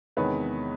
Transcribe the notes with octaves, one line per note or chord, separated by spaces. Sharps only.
E2 C3 D#3 G#3 B3 B4 C#5